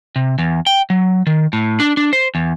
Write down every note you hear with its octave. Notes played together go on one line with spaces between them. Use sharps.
C3
E2
G5
F#3
D#3
A2
D4
D4
C5
E2